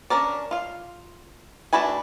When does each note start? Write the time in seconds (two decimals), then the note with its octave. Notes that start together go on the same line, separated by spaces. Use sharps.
0.10 C#4 D4 A#4 D5
0.51 F4 F5
1.73 A3 D4 F#4 B4 G#5